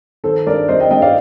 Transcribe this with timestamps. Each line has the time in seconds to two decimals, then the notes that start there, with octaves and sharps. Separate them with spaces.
0.24 D#3 A4 C5
0.47 G2 A#4 D5
0.68 G3 C5 D#5
0.80 D#5 G5
0.91 G2 D#5 G5
1.02 D5 F5